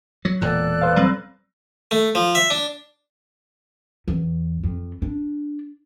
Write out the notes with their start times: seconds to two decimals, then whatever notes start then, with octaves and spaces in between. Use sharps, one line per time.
0.25 F#3
0.41 E1 A#2 A4 D5 F#6
0.82 B4 C5 F5
0.96 F#3 G3 C4
1.91 A3
2.15 F3
2.35 E5
2.50 D4
4.08 E2
4.63 F2
5.02 D4